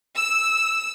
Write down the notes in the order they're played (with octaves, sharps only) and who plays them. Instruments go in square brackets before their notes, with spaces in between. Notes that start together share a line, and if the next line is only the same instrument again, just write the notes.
[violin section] E6